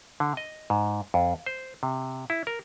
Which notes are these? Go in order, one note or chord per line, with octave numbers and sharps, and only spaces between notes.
D3
D#5
G#2
F2
C5
C3
E4
A#4